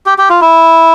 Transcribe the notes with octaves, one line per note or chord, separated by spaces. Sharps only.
G4
G4
F4
E4